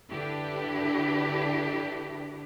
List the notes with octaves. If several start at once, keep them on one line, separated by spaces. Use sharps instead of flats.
D3 D4 E4 G4 B4